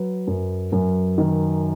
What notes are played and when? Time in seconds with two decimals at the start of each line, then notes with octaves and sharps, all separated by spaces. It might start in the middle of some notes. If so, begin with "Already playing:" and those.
Already playing: F#3 B4
0.27 F#2
0.72 F#2
1.18 D#3